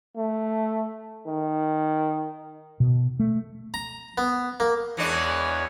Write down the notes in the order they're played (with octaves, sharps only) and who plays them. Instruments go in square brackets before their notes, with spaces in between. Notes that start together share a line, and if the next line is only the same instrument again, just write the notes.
[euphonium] A3
D#3
[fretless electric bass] B2
A3
[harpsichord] A#5
B3
A#3
[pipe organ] E2 C#5 [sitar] E3 G#3 D4